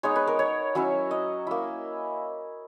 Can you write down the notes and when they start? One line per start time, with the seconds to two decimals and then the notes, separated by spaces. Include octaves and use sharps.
0.03 G#3 B3 D#4 C#5
0.16 B4
0.27 A#4
0.39 C#5
0.75 F#3 C#4 E4
1.11 D#5
1.47 A#3 E4